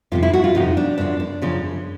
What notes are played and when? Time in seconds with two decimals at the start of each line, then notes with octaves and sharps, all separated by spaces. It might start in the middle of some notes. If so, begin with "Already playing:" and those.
0.12 F2 C3 F3 F4
0.23 E4
0.33 F#4
0.44 F4
0.55 F2 C3 F3 D#4
0.77 D4
0.98 F#2 C#3 F3 D4
1.20 D4
1.42 F#2 C#3 F3